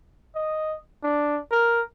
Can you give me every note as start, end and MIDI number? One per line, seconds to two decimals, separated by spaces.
0.35 0.76 75
1.03 1.40 62
1.52 1.81 70